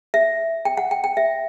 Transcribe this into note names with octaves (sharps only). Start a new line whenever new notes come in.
E5
G5
F#5
G5
G5
E5